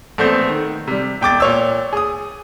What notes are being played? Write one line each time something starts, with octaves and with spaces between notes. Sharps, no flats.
A#1 A3 B3 C4 G6
D#3
C3 G3
E1 G5 D6 A6
A#2 C#5 E6
G#4 D#6